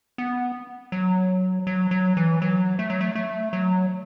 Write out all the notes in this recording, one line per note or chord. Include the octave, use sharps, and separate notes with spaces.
B3
F#3
F#3
F#3
E3
F#3
A3
F#3
A3
A3
F#3